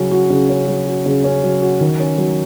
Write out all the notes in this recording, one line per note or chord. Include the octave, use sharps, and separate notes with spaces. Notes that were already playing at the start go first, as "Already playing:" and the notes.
Already playing: C#3 F#3 C#4
F#4
C#3
C#4
F#3
F#4
C#3
C#4
F#3
F#4
D#3
C#4
F#3